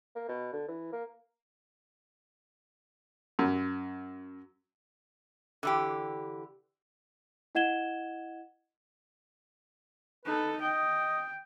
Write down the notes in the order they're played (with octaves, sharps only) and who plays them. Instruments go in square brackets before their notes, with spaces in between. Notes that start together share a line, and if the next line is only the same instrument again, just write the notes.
[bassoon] A#3
B2
D3
E3
A#3
[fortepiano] F#2
[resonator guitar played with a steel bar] D3 E3 G4
[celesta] E4 D#5 F#5 G#6 E7 G7
[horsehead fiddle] D#4 A4 [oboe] B4
[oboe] D#5 [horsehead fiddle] G5